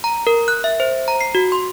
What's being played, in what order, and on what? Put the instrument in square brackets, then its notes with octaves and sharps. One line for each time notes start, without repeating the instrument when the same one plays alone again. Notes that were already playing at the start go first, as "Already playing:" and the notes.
[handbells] A#5
A#4
F#6
E5
C5
A#5
C7
F#4
C6